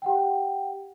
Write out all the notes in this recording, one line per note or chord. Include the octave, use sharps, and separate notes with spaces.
G4 F#5 G5